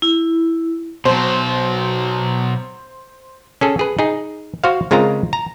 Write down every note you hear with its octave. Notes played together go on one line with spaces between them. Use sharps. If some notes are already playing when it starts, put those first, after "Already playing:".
E4
B2 F#3 C5
C#4 G#4 A4
G#4 B4
D#4 G#4
F#4 C5 F5
C#3 G#3 C4 F4 A#4 A#5
A#5